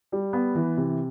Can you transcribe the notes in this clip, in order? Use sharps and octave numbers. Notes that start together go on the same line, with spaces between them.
G3
B3
E3
C3